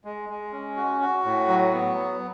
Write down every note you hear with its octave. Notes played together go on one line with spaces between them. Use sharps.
G#3
G#3
C#4
F#4
F#4
A2
F#3
B3
F#3